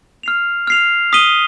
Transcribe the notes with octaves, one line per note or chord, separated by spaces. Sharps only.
F6 C7 F7
F6 C7 F7
D#6 B6 D#7 G7